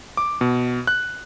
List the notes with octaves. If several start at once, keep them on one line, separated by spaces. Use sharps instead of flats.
D6
B2
F#6